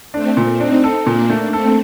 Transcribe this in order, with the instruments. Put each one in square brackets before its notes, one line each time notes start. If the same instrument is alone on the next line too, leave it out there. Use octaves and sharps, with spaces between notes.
[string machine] A3 C4 [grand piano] D4
[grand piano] A#2
[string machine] C4 D#4 [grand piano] D4
[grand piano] A4
[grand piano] A#2 [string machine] A#3 D4
[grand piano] A3
[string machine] A3 C4 [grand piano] A4